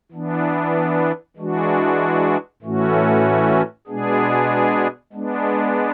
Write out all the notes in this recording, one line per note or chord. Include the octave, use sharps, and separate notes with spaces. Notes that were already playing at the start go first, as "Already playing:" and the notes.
E3 B3 D4
E3 G#3 D4 F#4
A2 E3 A3 C#4 F#4
B2 G#3 B3 D4 G#4
G#3 B3 D4